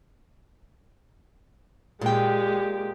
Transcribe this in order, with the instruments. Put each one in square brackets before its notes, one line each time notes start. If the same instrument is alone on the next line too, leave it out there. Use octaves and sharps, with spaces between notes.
[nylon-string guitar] A#2 G5 [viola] G#3 G4